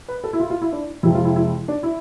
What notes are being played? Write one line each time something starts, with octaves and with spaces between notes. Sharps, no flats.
B4
A4
E4
F4
F4
E4
D4
F2 C3 F3 G#3 E4
F4
E4
E4
D4
E4